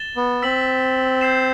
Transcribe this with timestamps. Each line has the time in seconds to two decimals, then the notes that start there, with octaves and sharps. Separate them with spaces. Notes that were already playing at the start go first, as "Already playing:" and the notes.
Already playing: A6 E7 G7
0.16 B3
0.42 C4 E6 B6 F#7
1.21 G6 C7 E7